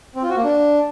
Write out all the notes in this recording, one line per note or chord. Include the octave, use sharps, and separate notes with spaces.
C4
F4
F#4
A#3
D4